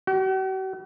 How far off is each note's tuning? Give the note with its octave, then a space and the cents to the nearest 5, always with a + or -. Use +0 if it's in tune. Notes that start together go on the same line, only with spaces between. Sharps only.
F#4 +45